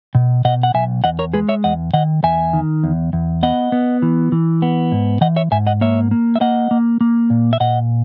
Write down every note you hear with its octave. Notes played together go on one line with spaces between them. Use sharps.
B2
B2 D#5 F#5
F#5
B1 E5 G#5
E2 D#5 F#5
A#4 C#5
G#3 G#4 B4
C#5 E5
E2 D#5 F#5
D#3 D#5 F#5
E2 E5 G#5
D#3
E2
E2
B3 D#5 F#5
B3
E3
E3
B3
G#2
E3 D#5 F#5
C#5 E5
G#2 E5 G#5
D#5 F#5
A#3 C#5 E5
A#3
E5
A#3 D#5 F#5
A#3
A#3
A#2
E5
A#2 D#5 F#5